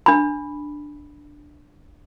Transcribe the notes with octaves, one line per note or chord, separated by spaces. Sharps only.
D4 B5